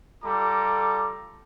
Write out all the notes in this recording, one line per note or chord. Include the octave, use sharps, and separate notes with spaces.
G3 F4 A4 A#5 D6